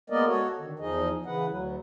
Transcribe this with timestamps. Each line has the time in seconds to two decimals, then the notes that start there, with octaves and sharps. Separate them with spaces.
0.10 G#3 A#3 B3 A#4 D5 D#5
0.26 F#4 A4 C#5
0.59 D3 D#3
0.79 E2 F3 D#4 G#4 D#5
1.26 C#3 E3 B4 F#5
1.48 D2 F#3